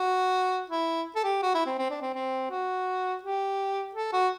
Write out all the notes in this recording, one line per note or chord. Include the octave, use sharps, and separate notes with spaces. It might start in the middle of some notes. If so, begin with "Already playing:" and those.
Already playing: F#4
E4
A4
G4
F#4
E4
C4
C4
D4
C4
C4
F#4
G4
A4
F#4